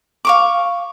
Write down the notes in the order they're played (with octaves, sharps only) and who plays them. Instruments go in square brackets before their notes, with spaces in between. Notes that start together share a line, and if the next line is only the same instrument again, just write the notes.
[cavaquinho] F5 C#6 D6